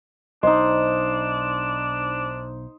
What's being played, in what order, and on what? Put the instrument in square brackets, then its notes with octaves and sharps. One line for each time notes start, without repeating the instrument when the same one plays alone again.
[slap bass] B1 [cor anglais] D4 [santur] D#4 C5 [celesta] D#5